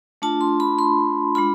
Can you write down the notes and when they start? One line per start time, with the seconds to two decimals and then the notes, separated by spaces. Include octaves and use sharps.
0.22 A3 D4 F4 A5
0.41 C6
0.60 B5
0.79 C6
1.35 G#3 D4 F4 B5